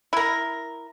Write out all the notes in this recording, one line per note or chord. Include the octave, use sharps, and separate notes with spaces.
E4 A#4